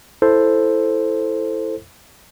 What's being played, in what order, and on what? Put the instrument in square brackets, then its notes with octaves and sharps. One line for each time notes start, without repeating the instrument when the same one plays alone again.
[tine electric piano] E4 A4 C5